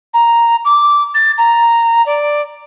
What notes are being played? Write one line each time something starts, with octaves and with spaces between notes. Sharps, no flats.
A#5
D6
A6
A#5
D5